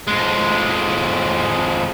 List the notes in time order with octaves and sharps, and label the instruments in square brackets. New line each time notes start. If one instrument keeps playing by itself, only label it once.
[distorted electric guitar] F2 G#3